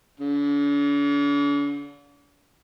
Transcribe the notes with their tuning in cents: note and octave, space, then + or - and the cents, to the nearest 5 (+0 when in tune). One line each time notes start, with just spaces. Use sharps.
D3 -45